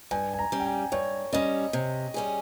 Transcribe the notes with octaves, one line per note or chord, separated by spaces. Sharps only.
G2 G#5
G#5
A#5
G3 C#4
G5
G#5
G2 C#5
G3 C#4 D#5
C3
G3 C#4 G#4